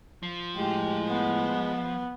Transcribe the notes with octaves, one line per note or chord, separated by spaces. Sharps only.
F3
A2 G#3 G4
B3